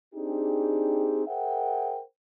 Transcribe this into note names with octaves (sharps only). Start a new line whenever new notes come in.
C4 D4 D#4 G4 G#4
G#4 A#4 C5 E5 F#5 G5